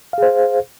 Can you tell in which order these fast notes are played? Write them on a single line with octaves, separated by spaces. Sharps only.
F5 G#4 C5